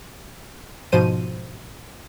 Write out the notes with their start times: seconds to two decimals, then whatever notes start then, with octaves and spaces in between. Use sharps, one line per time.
0.92 G#2 B2 F3 C5 D#7